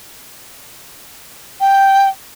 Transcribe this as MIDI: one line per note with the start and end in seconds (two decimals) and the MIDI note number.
1.60 2.09 79